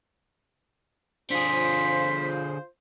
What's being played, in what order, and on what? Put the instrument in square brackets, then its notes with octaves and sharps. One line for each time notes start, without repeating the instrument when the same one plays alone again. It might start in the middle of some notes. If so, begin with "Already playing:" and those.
[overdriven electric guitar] D3 G#4 [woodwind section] F4 C5 [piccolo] B6